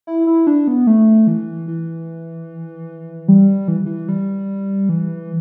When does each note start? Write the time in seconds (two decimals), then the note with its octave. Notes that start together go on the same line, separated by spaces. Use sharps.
0.07 E4
0.27 E4
0.47 D4
0.68 B3
0.87 A3
1.27 E3
1.68 E3
3.28 G3
3.68 E3
3.86 E3
4.09 G3
4.89 E3